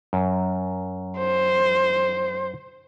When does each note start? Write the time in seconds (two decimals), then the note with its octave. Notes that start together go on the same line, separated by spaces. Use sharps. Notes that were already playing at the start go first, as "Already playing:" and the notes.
0.13 F#2
1.18 C5